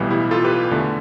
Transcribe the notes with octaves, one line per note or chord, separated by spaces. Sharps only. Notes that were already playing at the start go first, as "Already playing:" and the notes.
Already playing: B1 A2 E3 G3 B3
E4 G4
F4 A4
G4 B4
E2 D3 A3